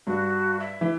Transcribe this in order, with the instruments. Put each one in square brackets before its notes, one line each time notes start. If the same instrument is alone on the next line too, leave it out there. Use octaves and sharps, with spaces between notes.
[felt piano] G2 [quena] F#4
[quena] E5
[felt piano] E3